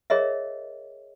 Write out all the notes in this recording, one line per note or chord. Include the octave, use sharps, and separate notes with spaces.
G#4 A#4 C#5 D#5 E5